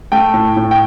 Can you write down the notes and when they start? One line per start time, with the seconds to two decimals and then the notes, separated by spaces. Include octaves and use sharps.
0.12 A3 G5
0.34 A2
0.57 A2
0.71 G5